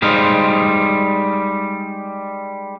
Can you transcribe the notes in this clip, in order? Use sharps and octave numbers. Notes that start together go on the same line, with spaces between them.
G3 G#3 D#4 C5 F5